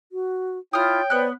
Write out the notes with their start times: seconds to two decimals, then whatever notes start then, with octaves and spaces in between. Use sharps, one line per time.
0.12 F#4
0.73 E4 F4 C#5 G5 D#6 F6
1.10 B3 B4 C5 D5 F#6